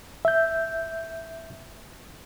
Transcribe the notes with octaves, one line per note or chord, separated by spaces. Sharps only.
E5 G6